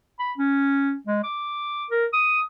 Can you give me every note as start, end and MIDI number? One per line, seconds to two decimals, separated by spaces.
0.19 0.33 83
0.38 0.95 61
1.07 1.20 56
1.23 1.85 86
1.90 2.06 70
2.13 2.40 87